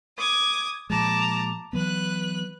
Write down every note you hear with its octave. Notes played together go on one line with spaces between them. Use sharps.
D6 D#6 G#6
A#2 F3 G#3 A5 A#5 D6
E3 F#3 B3 B4 F#6